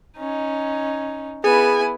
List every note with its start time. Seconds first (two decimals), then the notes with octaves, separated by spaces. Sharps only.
0.18 C#4 D#4
1.44 B3 E4 G#4 G#5